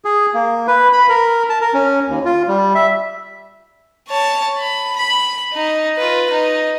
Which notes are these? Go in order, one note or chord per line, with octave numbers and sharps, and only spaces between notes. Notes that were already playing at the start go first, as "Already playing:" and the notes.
G#4
A#3
B4
B5
A#4
A5
A#4
C#4
D#2
F4
G3
E5
C#5 A5
B5
B5
D#4
F4 B4
D#4